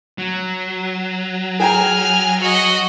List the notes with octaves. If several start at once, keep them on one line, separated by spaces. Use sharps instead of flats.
F#3
G#4 G5 G#5 A#5 F6
F#4 D#5